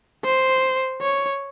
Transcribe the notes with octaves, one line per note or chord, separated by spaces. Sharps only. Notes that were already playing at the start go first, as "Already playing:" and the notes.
C5
C#5